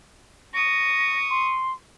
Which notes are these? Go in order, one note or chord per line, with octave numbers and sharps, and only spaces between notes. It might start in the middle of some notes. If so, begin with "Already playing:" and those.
C#6 D#6 A#6
C6